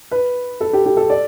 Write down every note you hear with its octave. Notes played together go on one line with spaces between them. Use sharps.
B4
A4
G4
G4
A4
D5